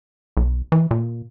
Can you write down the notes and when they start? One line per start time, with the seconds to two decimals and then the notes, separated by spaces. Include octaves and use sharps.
0.37 B1
0.72 E3
0.91 A#2